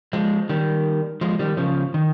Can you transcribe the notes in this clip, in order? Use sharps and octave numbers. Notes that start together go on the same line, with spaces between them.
F3 G#3
D#3 G3
F3 G#3
D#3 G3
C#3 F3
D#3